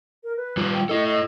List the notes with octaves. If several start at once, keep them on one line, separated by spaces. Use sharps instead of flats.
A#4
B4
G3 F4
G5
E4 A4 D#5
D#5